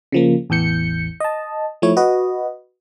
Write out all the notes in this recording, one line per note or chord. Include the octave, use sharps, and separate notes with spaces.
C#3 F3 A#3
A1 E2 E3 G6 C#7
D#5 A5
F3 A3 E4 C#5
F#4 B4 D#5